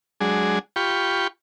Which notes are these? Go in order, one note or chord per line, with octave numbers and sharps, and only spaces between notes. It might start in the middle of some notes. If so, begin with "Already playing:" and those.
F#3 G#3 D4 G#4
F4 G4 G5 B5 C#6